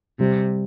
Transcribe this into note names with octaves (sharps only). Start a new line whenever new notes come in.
C3 G3